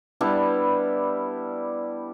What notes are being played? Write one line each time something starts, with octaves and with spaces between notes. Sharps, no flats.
G3 B3 D4 E4